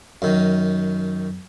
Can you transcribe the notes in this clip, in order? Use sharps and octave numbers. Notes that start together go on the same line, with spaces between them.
F#2 D#3